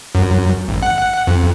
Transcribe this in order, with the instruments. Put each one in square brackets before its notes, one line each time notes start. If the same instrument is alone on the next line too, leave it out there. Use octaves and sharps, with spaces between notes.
[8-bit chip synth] F#2
G#1
F#5
F2